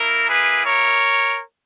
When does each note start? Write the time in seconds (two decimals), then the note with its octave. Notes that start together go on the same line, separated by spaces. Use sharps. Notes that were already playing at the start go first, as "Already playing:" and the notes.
Already playing: A#3 E4 A#4
0.29 G#4 B4
0.66 A#4 C#5